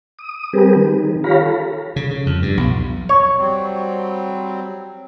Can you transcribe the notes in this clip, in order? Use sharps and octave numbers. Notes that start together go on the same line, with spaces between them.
D#6
G3 C4 G4 G#4 A#4 B4
D#3
F4 G4 C#5 F5 A#5 B5
A4
C#3
C#3
F2
G2
B1
F2
C#5
F#3 G3 C4